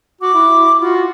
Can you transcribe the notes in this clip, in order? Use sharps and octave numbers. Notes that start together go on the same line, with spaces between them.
F#4 D6
E4
F4 F#4